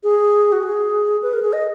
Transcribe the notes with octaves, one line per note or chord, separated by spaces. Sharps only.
G#4
F#4
G#4
B4
A#4
G#4
D#5